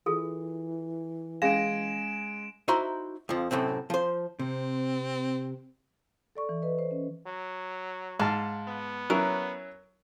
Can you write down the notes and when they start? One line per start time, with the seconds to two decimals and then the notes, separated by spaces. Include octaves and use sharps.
0.06 E3 F4 G#4 A4
1.42 G#3 C#4 G#4 F5 G#5 A#6 D7 E7
2.68 D#4 E4 F#4 C5 A#5 C6
3.29 F2 F3
3.51 F#2 A2 C3 C4
3.90 F3 C5
4.39 C3 C4
6.35 A4 D5 C#6
6.49 E3
6.62 B4 D#5
6.79 C5
6.91 C#4
7.27 F#3
8.20 G#2 F5 A5
8.68 B3
9.10 F#3 C#4 E4 A#4